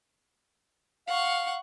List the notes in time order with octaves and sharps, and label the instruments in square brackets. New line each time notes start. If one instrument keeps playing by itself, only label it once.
[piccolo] F5 [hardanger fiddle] F#5 C#6